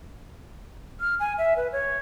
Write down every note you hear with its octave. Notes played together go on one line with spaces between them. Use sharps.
F6
G#5
E5
B4
C#5